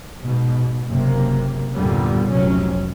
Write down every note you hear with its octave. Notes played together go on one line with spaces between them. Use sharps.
G#2 B2
F#1 C3 A#3
G1 E2 A#2 D3 G3 B3
F1 C2 C3 F#3 C#4